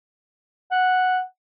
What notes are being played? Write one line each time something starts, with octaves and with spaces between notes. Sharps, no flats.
F#5